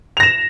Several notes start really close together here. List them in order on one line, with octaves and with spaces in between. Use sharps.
F7 A#6 E7